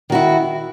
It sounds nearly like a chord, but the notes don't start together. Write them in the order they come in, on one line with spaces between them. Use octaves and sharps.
D#3 F#4 E4